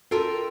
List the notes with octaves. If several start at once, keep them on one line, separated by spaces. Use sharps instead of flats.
F4 A4 A#4 E5 G5